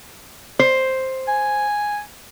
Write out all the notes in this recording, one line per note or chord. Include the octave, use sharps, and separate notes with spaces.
C5
G#5